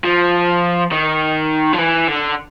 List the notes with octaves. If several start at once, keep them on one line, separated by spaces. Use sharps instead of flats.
F3
D#3
F3
E3
D3